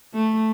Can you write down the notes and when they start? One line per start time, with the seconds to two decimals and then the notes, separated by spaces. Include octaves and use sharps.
0.14 A3